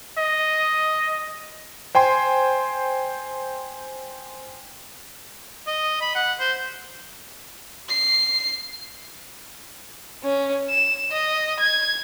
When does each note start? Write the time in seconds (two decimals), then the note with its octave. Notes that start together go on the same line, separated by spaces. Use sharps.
0.18 D#5
1.95 C5 G5 G#5 C6
5.67 D#5
6.01 B5
6.16 F#5
6.40 C5
7.89 C7
10.23 C#4
10.70 E7
11.12 D#5
11.60 G#6